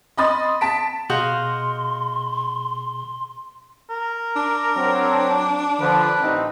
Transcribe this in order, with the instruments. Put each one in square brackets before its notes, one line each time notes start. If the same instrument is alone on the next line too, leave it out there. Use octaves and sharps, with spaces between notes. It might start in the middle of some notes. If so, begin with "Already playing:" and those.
[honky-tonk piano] D#5 B5 C6 D#6 A6
A5 B6 D7
[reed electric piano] B2 G#4 G6 [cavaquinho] F#4 D#5 F5 [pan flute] C6
[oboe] A#4
[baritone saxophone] D4
[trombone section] F#3 C4
[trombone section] D3 F3 [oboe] B4
[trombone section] A1 C4 D#4